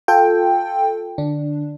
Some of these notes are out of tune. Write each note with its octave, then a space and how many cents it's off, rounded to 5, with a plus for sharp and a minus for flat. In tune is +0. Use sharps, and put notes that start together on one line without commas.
F4 +15 A4 +0 G5 +10
D3 +25 D4 +0